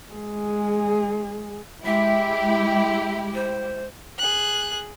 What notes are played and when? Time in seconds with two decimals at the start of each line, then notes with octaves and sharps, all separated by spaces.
0.13 G#3 G#4
1.85 G#3 E4 G4 E5
3.34 C5
4.18 G#4 F#6